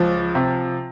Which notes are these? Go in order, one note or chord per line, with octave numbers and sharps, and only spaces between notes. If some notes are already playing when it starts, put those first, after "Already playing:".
Already playing: C#2 F3
C3